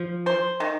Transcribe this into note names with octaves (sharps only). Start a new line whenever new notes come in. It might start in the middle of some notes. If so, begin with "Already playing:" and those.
Already playing: F3
C5
D#3